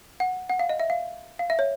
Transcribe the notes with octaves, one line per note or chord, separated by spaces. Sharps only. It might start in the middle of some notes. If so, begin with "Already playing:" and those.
F#5
F#5
F5
D#5
E5
F5
F5
E5
C#5